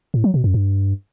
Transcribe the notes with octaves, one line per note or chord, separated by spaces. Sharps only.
A2
F#3
B2
F#2
G2